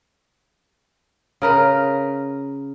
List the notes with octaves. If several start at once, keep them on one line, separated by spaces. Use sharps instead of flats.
C#3 A#4 B4